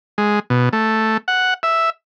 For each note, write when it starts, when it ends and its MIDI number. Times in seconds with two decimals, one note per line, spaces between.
0.18 0.40 56
0.50 0.69 47
0.73 1.17 57
1.28 1.54 78
1.63 1.90 76